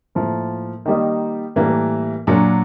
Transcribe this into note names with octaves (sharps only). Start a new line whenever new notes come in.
A2 F3 A#3
D#3 G3 A#3 D#4
A2 E3 G3 A#3
A#2 F#3 A#3 D4